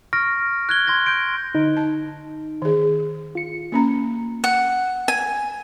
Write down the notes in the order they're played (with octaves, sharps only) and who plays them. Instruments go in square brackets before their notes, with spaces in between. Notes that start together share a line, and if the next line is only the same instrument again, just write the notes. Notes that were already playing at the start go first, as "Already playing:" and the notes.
[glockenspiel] C#6 F6 A#6 D7
F#6 G#6 G7
C6 F#6 G#6 A#6
G6 D7
[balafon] D3 [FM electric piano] D#4
[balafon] A5
D#3 G#4
[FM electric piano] F4 C#7
[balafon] A#3 C#4 A#5
[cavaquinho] F#5
G#5